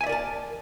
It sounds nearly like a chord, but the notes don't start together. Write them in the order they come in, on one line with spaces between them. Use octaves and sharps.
G#5 E5 D5 A#4 A5